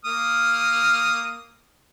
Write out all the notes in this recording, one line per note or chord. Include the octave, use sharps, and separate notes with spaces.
A#3 D#6 F6